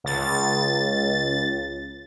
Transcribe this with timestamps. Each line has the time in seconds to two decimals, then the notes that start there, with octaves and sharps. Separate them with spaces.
0.04 C#2 A6